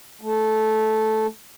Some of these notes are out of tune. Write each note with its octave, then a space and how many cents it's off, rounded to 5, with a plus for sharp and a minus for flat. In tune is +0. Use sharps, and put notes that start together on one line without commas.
A3 -10